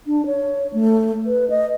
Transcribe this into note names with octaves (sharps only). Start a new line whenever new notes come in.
D4
C#5
A3
B4
D#5